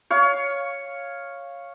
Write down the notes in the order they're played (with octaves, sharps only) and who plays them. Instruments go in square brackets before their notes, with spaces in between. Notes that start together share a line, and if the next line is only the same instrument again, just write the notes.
[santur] C#5 F5